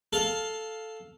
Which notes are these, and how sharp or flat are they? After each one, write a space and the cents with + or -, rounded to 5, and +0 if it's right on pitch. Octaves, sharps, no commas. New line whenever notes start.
A4 +0 F5 +5